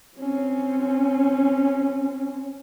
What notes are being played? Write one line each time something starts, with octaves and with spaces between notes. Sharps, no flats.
C4 C#4